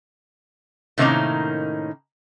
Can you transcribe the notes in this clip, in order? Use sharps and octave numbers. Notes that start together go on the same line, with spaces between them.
A2 C3 D#3 A#3 C#4 D#4